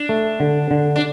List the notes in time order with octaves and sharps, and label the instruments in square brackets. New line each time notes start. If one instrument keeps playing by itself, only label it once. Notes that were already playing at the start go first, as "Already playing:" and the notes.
Already playing: [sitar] D4
[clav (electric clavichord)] A3
D3
D3
[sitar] D4